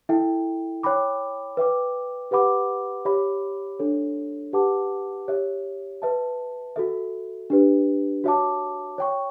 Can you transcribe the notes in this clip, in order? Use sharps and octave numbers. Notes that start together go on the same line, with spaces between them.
E4 A4 E5 G5
C#5 G5 B5 D6
B4 E5 G5 D6
G4 B4 F#5 B5 D6
G4 C#5 E5 B5 D6
D4 A4 C#5
G4 B4 F#5 A5 D6
G4 C#5 E5
B4 E5 A5
F#4 A4 E5
D4 G4 B4
F#4 C#5 E5 A5 D6
C#5 G5 C#6